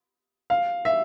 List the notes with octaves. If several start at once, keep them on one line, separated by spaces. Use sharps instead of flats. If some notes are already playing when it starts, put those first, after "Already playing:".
F5
E5